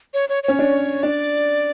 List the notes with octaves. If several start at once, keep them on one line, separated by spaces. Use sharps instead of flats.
C#5
C#5
C#4 C#5
D4
D4 D5